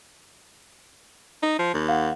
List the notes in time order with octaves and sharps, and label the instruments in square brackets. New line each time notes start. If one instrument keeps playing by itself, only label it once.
[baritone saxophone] D#4
F3
D#2
[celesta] F5 F#5